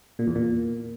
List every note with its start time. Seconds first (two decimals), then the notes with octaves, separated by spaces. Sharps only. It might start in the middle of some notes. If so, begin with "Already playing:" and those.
0.19 A#2
0.27 E2
0.35 A#2